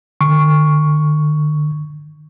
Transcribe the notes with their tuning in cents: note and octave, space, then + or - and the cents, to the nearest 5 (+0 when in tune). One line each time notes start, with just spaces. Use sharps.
D3 +45 C#6 +0